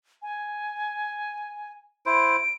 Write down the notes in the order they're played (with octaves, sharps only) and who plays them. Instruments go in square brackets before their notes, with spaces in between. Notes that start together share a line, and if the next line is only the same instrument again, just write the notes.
[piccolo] G#5
[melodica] E4 C5 [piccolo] D7